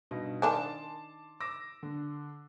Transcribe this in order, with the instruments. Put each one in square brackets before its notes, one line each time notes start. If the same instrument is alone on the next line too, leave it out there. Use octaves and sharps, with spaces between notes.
[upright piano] G2 B2 D#4
[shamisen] D#3 D4 G#5 [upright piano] A5 C6 D6
[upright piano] D6 E6 A#6
D3